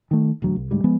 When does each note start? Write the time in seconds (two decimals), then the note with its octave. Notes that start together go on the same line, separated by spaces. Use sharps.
0.11 D#3 A3
0.42 E1 D2 F#3
0.56 C2
0.71 D2 G#2 G3 G#3
0.84 F3 G#3 B3